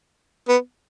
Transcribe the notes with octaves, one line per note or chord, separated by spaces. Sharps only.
B3